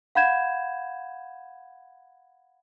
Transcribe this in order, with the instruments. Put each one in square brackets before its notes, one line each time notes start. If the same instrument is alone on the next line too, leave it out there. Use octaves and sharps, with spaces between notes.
[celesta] F5 F#5 B5 G6 G#6 E7